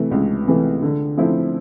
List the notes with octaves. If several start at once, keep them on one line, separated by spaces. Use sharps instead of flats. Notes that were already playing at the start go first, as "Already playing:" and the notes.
Already playing: C3 E3 A3
C#2
C3 E3 A3
D3
F3 A3 C4 E4